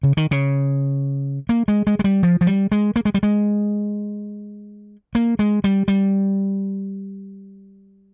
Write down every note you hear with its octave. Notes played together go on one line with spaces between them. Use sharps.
C#3
D#3
C#3
A#3
G#3
G#3
G#3
G3
F3
F3
G3
G#3
A#3
G#3
G3
G#3
A#3
G#3
G3
G3